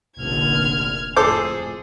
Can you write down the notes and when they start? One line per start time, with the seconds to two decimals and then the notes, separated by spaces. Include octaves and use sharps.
0.19 F1 A#1 D3 F6 G#6
1.16 F2 A2 G#4 A4 C5 D6